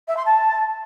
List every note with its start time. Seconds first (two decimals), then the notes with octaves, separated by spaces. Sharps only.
0.08 E5
0.17 C6
0.26 A5